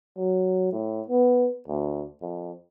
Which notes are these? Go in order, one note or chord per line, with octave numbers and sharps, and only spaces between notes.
F#3
A2
B3
D2
F2